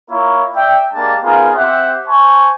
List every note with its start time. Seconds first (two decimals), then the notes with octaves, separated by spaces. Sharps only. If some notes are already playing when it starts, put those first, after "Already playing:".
0.10 A#3 E4 F4 A#4 C#5
0.55 D5 E5 G5
0.93 G#3 A#3 D4 G4 A5
1.23 B3 D#4 F4 G#4 A#4
1.55 C4 G4 C5 E5 F#5
2.07 C5 G#5 A5 C#6